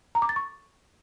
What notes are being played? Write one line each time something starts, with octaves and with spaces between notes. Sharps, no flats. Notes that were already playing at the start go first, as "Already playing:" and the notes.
A#5
D6
A6
C#6